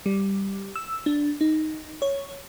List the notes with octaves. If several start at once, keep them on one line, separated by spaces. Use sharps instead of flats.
G3
E6
D4
D#4
C#5